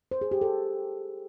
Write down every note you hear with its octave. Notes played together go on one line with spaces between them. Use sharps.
C5
G#4
G4
A4